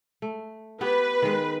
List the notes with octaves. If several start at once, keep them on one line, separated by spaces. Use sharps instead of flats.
A3
B3 G4 B4
D#3 G#3